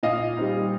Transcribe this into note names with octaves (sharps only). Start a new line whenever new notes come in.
A#2 D#5 F5
G3 C4 D#4